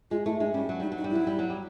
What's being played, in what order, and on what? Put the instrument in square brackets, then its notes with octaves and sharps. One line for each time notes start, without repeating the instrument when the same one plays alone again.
[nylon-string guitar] G#3 [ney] F4
[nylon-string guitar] A3 [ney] E4
[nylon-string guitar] G#3 [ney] D4
[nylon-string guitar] G3 [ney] C#4
[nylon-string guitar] F#3
[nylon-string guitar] G3 [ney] D#4
[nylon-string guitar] F#3
[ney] D#4
[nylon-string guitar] G3
[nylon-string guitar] F#3 [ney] E4
[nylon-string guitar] G3
F#3
G3